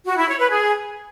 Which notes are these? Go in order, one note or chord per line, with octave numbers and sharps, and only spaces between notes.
F#4
E4
C#5
B4
G#4